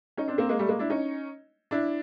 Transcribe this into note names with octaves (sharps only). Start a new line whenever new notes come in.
C#4 D#4
C4 D4
A#3 C4
G#3 A#3
G3 A3
G#3 A#3
D4 E4
C#4 D#4
D4 E4